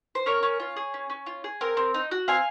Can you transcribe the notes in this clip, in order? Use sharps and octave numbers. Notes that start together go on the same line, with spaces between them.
C5
C#4 A#4 C#5
C#4
F4
G#4
C#4
C#4
F4
G#4
C4 A#4
C4
D#4
F#4
C4 F5 G#5